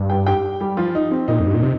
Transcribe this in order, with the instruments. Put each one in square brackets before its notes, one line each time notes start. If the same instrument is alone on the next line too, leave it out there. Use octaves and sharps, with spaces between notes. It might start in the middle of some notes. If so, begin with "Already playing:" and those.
Already playing: [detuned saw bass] G2
[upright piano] G4 G5
G4 G5
G3 G4
F3 F4
D#4
C4
[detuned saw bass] A#2 [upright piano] D#4
[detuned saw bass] F2
G2
A#2
C3